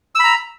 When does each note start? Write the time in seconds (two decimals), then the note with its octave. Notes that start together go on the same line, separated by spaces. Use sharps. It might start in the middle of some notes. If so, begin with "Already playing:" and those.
0.15 E6
0.19 B5
0.24 A#5